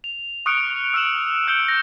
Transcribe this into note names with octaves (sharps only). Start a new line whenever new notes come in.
F7
C#6 D#6 F6 F#6 C#7 D7
E6 F6 C#7 D7 E7 F#7
E6 G6 C#7 D7 G7
A#6